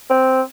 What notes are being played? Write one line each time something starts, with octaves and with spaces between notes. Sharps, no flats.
C4